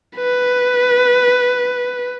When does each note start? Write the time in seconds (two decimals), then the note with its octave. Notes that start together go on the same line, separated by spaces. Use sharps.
0.17 B4